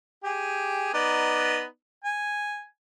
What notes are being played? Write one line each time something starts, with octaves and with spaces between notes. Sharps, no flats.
G4 G#4
B3 D#4 D5
G#5